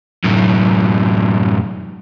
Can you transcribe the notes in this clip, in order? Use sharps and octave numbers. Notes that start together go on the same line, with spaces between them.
F#2 A2